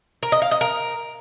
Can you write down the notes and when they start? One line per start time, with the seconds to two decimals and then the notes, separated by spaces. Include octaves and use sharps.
0.23 A#4
0.32 D#5
0.42 F5
0.51 D#5
0.61 A#4